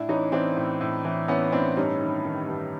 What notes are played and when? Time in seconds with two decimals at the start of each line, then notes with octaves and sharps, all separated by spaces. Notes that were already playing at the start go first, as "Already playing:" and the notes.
Already playing: A2 D4 E4
0.09 E3 C#4 D#4
0.32 E3 C4 D4
0.56 A2
0.81 A2
1.05 E3
1.28 E3 B3 C#4
1.52 A2 C4 D4
1.77 G2 C#4 D#4
2.01 D#3
2.24 D#3
2.48 G2